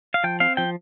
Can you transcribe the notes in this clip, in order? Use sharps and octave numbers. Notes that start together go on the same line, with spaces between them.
F5
F3 G5
C4 F5
F3 G5